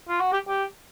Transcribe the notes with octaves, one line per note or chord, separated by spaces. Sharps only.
F4
F#4
G4
G4